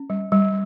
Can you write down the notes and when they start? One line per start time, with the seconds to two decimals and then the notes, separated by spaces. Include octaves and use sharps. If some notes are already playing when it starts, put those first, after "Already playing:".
Already playing: C#4
0.10 G3
0.32 G3